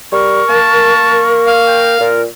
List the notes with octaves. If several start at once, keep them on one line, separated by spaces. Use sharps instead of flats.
G3 A#4 C#6
A#3 A5
F5
G5
A#2 F4 A#4